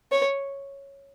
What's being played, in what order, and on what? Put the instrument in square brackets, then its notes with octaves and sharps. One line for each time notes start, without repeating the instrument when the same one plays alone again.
[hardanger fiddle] C#5